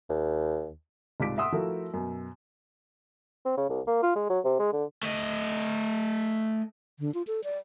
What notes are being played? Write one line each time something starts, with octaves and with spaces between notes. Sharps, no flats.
D#2
C2 G#2 F4 D6 B6 D7
E5 F#5 C6 D#6 E6
F3 A3 E4 F#4 A4 A#4
F#2 B2
C4
C#3
C2
A#3
F4
G#3
F#3
C3
G#3
D3
A3 D#5
D3
F4
A4
D5